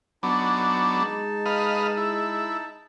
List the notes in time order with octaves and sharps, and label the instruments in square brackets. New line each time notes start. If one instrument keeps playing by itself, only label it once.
[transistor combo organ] F#3 B3 D4 [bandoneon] D#4 A5
[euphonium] G#3
[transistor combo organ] B4 D#5 F5
E4